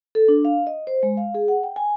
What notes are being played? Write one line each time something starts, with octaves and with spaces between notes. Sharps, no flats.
A4
D4
F5
D#5
C5
G#3
F5
G#4
F#5
G5
G#5